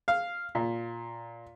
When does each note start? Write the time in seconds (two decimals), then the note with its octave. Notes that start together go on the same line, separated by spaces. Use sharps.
0.08 F5
0.55 A#2